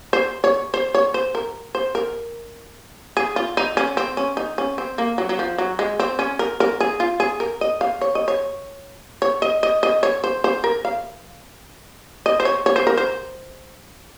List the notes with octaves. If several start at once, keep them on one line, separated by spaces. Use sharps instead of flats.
C5
C#5
C5
C#5
C5
A#4
C5
A#4
G#4
F4
D#4
C#4
C4
C#4
D#4
C#4
C4
A#3
F#3
F#3
F3
F#3
G#3
C4
C#4
A#4
A#4
G#4
F4
G#4
A#4
D#5
F5
C#5
D#5
C#5
C#5
D#5
D#5
D#5
C#5
C5
C5
A#4
F5
D#5
C5
C#5
C#5
C5
A#4
C5